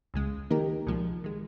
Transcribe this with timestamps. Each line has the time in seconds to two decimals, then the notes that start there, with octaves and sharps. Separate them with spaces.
0.14 C#2 C#3 G#3
0.50 D#3 A#3 D#4 G4 A#4
0.87 C2 A#2 F3 G#3
1.24 D#3 G#3